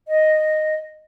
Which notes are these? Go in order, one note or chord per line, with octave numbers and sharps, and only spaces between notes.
D#5